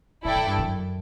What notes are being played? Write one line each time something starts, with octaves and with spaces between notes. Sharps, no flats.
A2 E4 A4 D5 G5
A2
G2
F#2